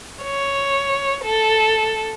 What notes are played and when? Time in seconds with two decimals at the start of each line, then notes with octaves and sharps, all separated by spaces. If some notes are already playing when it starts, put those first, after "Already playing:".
0.24 C#5
1.24 A4